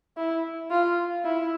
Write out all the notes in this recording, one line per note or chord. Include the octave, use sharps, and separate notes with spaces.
E4
F4
E4